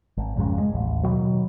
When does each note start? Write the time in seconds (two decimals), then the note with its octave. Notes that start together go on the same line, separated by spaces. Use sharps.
0.17 G#1
0.36 A#1 F2 G#2 C#3
0.60 G#3
0.73 A1 D#2
1.03 B2 D#3 F#3